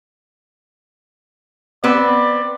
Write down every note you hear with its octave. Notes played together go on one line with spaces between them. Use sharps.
B3 C4 B4 D5